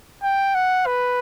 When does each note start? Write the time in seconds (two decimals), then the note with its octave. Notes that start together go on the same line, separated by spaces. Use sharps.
0.23 G5
0.55 F#5
0.86 B4